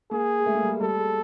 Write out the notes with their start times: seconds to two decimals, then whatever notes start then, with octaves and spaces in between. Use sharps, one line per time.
0.11 A#3 G#4
0.39 G#3
0.46 A3
0.55 A#3
0.63 G3
0.72 G#3
0.81 G3 A4
0.98 G#3